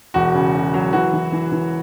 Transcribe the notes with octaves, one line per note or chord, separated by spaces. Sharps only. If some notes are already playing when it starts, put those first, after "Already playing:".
E1 F#4
C#3
C#3
F#3
E3 F#4
E3
E3
E3